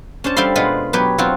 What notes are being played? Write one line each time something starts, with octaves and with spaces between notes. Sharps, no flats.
C#4 D4 C5 A5
G3 A4 C5 F5 B5 C6
B2 G#3 F4 B4 F#5
F#3 B3 G4 B4 C#5
F#3 C4 F4 F#4